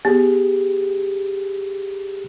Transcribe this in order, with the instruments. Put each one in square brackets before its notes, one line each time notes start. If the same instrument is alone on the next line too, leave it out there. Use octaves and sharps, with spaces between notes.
[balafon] B3 [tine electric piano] G4 G#4